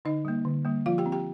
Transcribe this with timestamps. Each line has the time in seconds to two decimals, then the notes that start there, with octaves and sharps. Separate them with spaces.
0.05 D3 D#4 D#5
0.25 G3 A#3
0.45 D3
0.65 G3 A#3
0.86 F3 F4 F5
0.98 G4 G5
1.06 C4
1.12 G4 G5